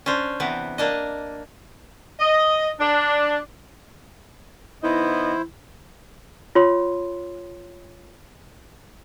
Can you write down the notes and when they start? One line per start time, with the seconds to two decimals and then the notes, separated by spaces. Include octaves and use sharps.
0.06 C#4 D4 C5
0.40 C3 E3 B3
0.78 A#3 D4 D#5
2.20 D#5
2.80 D4
4.83 E3 B3 D#4 E4 C5 D#5
6.55 F4 C#5 C6